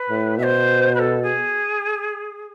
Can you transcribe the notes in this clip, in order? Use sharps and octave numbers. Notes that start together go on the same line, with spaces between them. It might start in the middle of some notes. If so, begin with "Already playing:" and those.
Already playing: B4
A2
B2 C5 E5
B4
A4
G#4